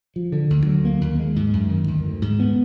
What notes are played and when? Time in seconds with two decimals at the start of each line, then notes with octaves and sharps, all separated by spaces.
0.16 F3
0.32 D3
0.50 D2
0.67 F#3
0.85 A#3
1.01 D#2
1.19 G#3
1.36 G#2
1.53 F#2
1.70 D#3
1.88 D2
2.05 D2
2.22 G#2
2.40 B3